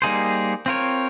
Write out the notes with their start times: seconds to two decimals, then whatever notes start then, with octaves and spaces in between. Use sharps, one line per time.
0.02 G3 A#3 D#4 G#4 C5
0.66 C4 F4 A#4 C#5